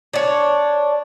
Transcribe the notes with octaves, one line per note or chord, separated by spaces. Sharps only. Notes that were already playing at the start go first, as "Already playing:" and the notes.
D4 C#5